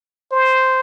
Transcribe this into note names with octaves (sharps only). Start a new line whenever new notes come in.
C5